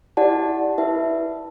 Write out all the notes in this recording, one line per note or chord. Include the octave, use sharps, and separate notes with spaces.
E4 G4 D5 F#5 A5
E4 B4 E5 A5